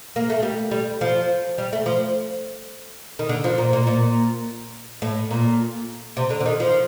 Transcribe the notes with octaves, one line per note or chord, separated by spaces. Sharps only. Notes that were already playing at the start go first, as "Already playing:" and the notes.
A#3
A3
G3
G3
F3
G3
A3
F3
D#3
D3
F3
A#2
A#2
A#2
A2
A#2
C3
D3
D3
D#3
F3